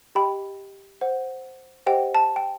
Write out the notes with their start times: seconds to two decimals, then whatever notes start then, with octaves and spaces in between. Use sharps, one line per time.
0.15 G4 D#5 G5 B5
1.01 C5 F#5
1.86 G4 C5 D#5 F#5 G5
2.15 A5
2.36 G5